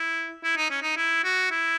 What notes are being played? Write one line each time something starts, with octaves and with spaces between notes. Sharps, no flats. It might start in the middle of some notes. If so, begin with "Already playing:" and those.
Already playing: E4
E4
D#4
C#4
D#4
E4
F#4
E4